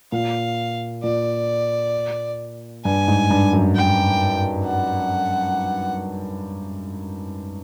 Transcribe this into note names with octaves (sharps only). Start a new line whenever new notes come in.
A#2 F5
A#2 D5
G2 G#5
G#2
G2
F#2
G5
F#5